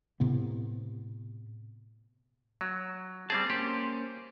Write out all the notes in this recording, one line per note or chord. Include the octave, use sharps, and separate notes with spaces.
A2 C3 B3
F#3
G3 C4 G#4 A5
A#3 C#4 G4 C5